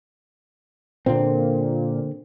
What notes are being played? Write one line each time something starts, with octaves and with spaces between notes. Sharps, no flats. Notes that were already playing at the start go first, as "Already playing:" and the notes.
A#2 D3 C4